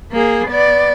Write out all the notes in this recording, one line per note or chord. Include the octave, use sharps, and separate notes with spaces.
A#3 G#4
B3 D5